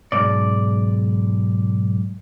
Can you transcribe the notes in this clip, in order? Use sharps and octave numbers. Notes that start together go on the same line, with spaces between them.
B1 G#2 D5